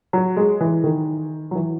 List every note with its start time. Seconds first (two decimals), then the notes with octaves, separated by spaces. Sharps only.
0.13 F#3
0.36 G#3
0.60 E3
0.84 D#3
1.51 F#3
1.55 E3